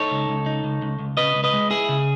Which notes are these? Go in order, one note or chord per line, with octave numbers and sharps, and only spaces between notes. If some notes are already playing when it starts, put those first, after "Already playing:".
Already playing: D#4 A4 C#5
C#2
C#2
D#4
C#2
C#2
C#2
C#3 B4 D#5
C#2
B4 D#5
G#3
E4 G#4
C#3